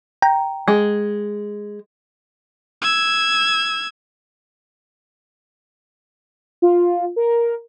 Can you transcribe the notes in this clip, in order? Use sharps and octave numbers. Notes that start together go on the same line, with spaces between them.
G5 A#5
G#3
E6 G#6
F4
A#4